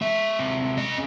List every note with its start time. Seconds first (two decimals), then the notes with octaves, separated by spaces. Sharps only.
0.01 G#3 E5
0.39 C3
0.77 C#4 D#5